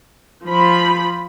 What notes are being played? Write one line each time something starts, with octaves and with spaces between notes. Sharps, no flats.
F3 B5